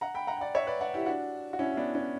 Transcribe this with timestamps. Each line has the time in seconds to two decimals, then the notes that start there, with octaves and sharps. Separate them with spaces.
0.01 F#5 A#5
0.14 G5 B5
0.27 F#5 A#5
0.37 G5
0.41 D5 F#5
0.55 C#5 E5
0.67 B4 D5
0.81 D5 F#5
0.94 E4 G4
1.06 D4 F#4
1.53 F#4
1.59 C#4 E4
1.72 E4
1.77 B3 D4
1.95 C#4